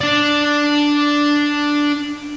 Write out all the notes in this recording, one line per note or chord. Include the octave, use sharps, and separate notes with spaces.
D4 D5